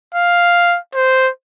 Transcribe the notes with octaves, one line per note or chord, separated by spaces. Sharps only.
F5
C5